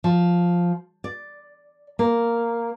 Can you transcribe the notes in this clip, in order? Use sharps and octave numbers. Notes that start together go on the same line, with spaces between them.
F3
D5
A#3